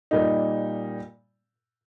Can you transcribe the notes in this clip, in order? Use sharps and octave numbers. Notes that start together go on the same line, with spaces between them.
A#2 G3 A#3 D#4